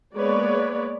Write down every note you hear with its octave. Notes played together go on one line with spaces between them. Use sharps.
G#3 A#3 B3 B4 C#5 D5